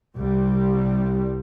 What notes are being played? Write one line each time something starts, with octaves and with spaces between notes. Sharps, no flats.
C2 G3